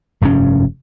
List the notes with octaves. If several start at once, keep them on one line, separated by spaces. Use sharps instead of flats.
F1 G2 B2 C#4